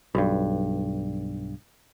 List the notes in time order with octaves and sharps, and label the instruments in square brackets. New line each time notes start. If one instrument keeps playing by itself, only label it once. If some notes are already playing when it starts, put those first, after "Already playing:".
[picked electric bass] B1 G2